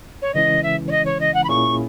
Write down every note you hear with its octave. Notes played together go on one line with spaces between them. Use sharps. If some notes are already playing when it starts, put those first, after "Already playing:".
C#5
C#3 E3 G#3 C#4 E4 D#5
E5
C#5
D#5
C#5
D#5
F#5
B5
A#2 A#3 C#4 E4 G#4 C#6